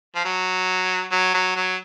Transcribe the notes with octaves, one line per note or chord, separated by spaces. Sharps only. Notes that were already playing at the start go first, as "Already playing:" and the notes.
F3
F#3
F#3
F#3
F#3